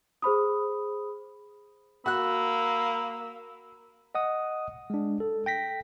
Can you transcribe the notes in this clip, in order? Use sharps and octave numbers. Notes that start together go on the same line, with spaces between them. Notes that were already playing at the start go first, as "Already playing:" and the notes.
G#4 C5 B5 D#6
A#3 F#4 B5 E6 F#6
D#5 F#5 D#6
G#3 D4
A4
G5 A#6 B6